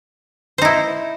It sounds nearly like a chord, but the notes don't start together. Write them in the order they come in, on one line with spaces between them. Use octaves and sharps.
C5 D#4 E4